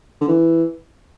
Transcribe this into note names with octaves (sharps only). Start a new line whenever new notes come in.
D3
E3